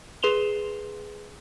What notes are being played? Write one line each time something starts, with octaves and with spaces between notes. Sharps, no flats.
G#4 B4 C6 E7 F7 G7